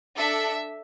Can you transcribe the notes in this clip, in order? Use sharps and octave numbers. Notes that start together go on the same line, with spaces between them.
D4 A4 E5